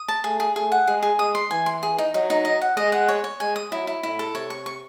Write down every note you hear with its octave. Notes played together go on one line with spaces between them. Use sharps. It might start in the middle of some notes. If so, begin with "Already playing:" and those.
Already playing: D#6
A5
A3 G#4
G#4
A3 G#4
F#5
G#3 G#4
G#4
G#3 D#6
C6
E3 G#5
C6
G#4
D#4
F#3 D#4
D#4
D#5
F#5
G#3 D#5
F#5
C#5
C#5
G#3 G#5
D#6
F#3 E4
E4
A2 E4
A4
C3 C#5
C#6
C#6